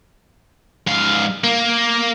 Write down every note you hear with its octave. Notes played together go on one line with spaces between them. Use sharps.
G#2 F5
A#3